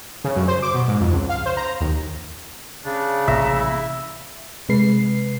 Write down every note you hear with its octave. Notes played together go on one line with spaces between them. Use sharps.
C#3
F#2
C5
D6
B2
G#2
F2
C#2
F5
C5
A#5
D#2
C#3 D4
A1 C3 A#3 E5 A#5
E4
C3 G#3 B4 C7